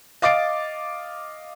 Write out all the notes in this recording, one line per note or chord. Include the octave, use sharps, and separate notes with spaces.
D#5 F5 D6 A6 C7 D7